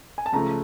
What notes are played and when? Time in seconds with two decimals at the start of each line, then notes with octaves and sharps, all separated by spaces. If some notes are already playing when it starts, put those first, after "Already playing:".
0.18 G#5
0.26 A5
0.33 C#2 C#3 F3 A3 A#5